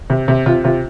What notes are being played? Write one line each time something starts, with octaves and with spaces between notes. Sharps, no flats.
C3
C3
C3 F4
C3 F4